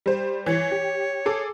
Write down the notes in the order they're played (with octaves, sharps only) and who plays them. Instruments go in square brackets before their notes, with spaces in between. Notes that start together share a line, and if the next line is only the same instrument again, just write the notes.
[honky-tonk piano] G3 C5
[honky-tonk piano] E3 [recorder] C#5
[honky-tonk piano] G4
G#4 A4 D6